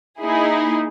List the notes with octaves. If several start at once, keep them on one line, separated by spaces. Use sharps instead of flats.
A#3 D#4 E4 G#4